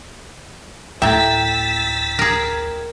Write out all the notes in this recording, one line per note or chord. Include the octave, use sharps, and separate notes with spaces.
D2 A2 E5 G5 A#5 E6 A6 B6
G#4 A#4